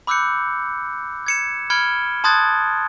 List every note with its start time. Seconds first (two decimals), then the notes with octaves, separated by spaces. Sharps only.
0.07 B5 D6 E6 F#6 G6 C#7
1.27 G#6 C#7 E7
1.70 B5 F6 G#6 C#7 D7 G7
2.24 A5 C6 D#6 F#6 G#6 A6